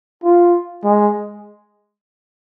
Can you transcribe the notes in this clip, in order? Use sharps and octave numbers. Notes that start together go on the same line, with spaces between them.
F4
G#3